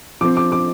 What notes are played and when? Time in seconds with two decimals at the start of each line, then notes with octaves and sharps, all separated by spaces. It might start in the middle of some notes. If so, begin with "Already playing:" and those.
0.21 F3 C4 D6
0.37 D6
0.52 D6